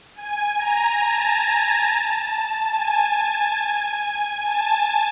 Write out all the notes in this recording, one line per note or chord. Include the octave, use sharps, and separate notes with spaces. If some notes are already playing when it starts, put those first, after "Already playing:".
G#5
A#5
A5
G#5
A5